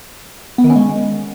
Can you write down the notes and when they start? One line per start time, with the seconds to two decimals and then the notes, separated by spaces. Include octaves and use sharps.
0.58 B3
0.64 D#3
0.70 C#4
0.76 G#3